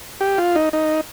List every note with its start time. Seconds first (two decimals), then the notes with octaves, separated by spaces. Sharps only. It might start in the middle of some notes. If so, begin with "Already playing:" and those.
0.21 G4
0.38 F4
0.55 D#4
0.73 D#4